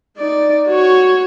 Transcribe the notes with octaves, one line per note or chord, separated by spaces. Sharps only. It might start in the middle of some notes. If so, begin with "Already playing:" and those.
D#4 D5
F#4 C#5